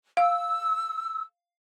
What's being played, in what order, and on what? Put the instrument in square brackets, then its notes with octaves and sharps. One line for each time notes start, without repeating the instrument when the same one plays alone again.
[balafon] F5 [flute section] E6